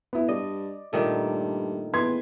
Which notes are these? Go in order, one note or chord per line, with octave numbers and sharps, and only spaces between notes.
B3 E4
G2 D5 D#5
G2 A#2 D#3 A3
E2 B4 C6 G#6